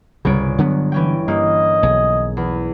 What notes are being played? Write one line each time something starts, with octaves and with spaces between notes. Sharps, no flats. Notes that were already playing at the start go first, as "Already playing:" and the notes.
G1 C2 C#3 C#5 D7
D3 F#3 B3
E3 C#4 G5
G2 A#3 D#5
B1 G#4
E2